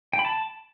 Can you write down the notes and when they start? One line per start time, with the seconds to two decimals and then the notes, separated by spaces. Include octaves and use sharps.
0.13 G5
0.19 B5
0.25 A5